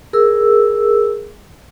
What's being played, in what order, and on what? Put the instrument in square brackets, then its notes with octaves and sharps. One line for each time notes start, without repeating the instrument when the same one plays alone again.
[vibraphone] G#4 A#4 E6